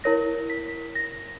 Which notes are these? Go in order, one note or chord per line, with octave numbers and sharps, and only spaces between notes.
E4 A#4 C#5 A#6
B6
A#6